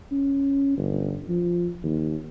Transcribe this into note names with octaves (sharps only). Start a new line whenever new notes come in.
C#4
G1
F3
D#2